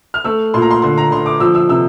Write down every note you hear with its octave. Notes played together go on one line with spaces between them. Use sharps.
F6
A3 E6
A#2 C6
A#5
C6
D3 C6
A#5
D3 C6
D6
F3 E6
E6
C3 E6